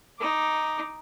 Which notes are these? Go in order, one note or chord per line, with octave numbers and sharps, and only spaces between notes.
D#4 D6